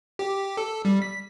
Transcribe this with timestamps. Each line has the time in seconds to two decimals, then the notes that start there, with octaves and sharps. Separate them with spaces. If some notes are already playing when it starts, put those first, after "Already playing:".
0.19 G4
0.57 A4
0.85 G3
1.02 B6